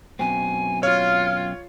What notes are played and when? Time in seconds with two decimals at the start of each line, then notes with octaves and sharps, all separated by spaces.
0.19 F#2 B2 C4 G#5
0.83 F4 C#5 F6